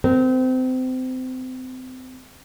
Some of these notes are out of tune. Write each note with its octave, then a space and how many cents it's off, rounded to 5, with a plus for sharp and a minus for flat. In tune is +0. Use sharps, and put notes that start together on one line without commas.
C4 -30 A#4 -15